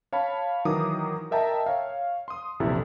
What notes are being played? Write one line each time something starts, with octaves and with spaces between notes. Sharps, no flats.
C#5 F5 A5 B5
D#3 E3 F#3 A#5 D6 D#6
A#4 D#5 E5 G5 A5 A#5
C#5 F5
C6 D#6
A#1 E2 C3 E4 A4